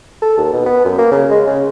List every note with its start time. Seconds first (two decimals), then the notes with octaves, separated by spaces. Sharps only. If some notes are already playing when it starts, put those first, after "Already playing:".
0.22 A4
0.37 D#2
0.53 B2
0.66 B3
0.85 F#2
0.98 A#3
1.11 C#3
1.30 G#3
1.47 C#3